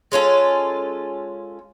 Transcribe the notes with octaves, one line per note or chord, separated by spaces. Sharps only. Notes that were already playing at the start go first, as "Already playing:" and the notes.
G#3 C#4 F4 A4